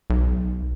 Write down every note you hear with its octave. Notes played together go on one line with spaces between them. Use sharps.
B1